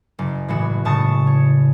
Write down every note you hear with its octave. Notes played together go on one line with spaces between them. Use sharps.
F#1
A2 E3 G#3 F#4
A2 C#3 A5 C#6 D#6 A6
C#5